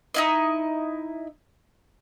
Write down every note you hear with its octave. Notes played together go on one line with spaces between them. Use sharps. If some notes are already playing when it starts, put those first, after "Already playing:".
D#4 E4 D#5